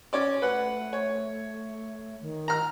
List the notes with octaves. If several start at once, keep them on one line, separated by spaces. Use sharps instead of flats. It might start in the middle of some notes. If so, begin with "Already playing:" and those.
C#4 C#5 D5
A3 B4 F#5
C#5
D#3
A#5 F6